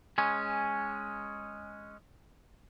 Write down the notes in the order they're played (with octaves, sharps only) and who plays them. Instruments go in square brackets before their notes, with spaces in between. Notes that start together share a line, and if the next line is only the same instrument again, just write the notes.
[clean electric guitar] G#3 C#4